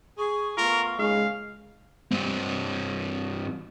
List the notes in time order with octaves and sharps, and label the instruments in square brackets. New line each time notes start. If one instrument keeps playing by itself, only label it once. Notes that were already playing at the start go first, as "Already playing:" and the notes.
[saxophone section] G#4 [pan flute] C#6
[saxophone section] A3 B3 F4 [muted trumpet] A#4
[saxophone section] A#2 C#3 D#4 [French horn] G#3 [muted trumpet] F5
[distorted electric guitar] G2 C4